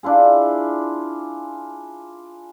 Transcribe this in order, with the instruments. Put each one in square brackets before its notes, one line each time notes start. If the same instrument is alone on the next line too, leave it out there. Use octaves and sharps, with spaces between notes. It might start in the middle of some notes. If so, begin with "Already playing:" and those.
[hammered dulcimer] D4 E4 F4 G#4